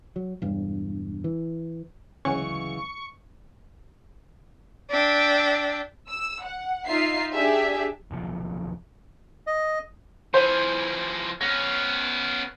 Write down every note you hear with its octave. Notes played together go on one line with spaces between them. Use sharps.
F#3
E1 G2
E3
D2 C#3 E3 F#3 G#3 C#4 F#5 C#6
D4 E5 G5
E6
F#5
D#4 F4 E5 C7
D4 G4 G#4 E5
F1 B1 F3
D#5
E3 F3 C5
B3 C#4 A#6